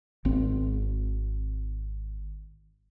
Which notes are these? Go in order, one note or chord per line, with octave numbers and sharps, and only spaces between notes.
G#1 C4